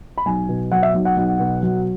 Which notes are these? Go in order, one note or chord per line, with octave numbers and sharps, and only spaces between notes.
B5
B1 G#5
B2
F#3 F#5
E5
B1
F#5
B1
B2
F#3